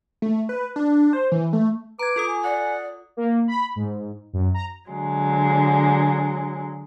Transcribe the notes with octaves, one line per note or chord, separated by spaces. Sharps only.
A3
B4
D4
C5
E3
A3
B4 A#5 D6 G#6
F4 A4 D#6
G#5
D5 F#5
A#3
B5
G#2
F#2
A#5
D3 F#3 G#3